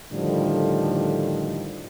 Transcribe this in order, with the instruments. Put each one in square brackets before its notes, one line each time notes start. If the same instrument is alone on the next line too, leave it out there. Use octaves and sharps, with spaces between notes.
[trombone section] A2 D3 D#3 F3 G3